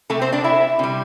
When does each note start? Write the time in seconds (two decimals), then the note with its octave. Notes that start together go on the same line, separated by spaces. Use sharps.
0.10 C3 A3 A4
0.21 C4 C5
0.32 D4 D5
0.44 E4 E5
0.79 C3 G3